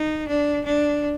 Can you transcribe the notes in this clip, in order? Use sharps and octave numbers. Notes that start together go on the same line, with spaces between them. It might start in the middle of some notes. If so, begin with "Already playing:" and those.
Already playing: D#4
D4
D4